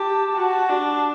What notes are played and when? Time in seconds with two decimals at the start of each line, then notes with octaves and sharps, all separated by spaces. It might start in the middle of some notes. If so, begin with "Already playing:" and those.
Already playing: G4 A5
0.36 F#4
0.69 D4